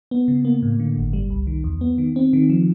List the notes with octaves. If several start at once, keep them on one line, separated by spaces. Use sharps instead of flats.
B3
C#3
A#3
A2
D3
G1
G3
C2
D#3
E2
B3
D#3
C4
D#3
F3